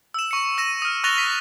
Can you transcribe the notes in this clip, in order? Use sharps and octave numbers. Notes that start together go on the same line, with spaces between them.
E6 E7
C#6 C#7
E6 A#6 D#7 E7
D#6 F6
C#6 F#6 A6 A#6 F7 G7
B6